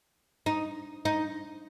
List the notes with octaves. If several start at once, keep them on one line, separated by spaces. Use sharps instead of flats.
D#4
D#4